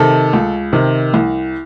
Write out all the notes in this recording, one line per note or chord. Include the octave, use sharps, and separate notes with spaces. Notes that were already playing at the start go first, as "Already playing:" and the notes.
Already playing: C3 D#3 A4
C#2
C3 D#3
C2